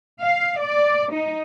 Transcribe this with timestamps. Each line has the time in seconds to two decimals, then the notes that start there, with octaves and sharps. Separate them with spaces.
0.21 F5
0.59 D5
1.12 D#4